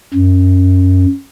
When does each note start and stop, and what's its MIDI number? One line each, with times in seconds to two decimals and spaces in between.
0.14 1.06 42